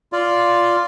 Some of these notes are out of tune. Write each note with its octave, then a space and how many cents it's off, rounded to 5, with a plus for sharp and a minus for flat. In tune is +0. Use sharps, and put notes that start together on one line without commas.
F4 +0 D5 -10